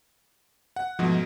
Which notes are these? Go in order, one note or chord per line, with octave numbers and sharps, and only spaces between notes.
F#5
G#2 B2 F3 A3